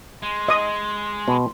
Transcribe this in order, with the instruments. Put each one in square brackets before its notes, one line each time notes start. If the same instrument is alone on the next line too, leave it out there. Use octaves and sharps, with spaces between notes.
[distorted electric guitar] G#3 [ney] C6
[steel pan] D#5 D#6
[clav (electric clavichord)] B2